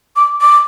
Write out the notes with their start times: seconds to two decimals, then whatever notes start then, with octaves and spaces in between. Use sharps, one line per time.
0.16 D6
0.41 D6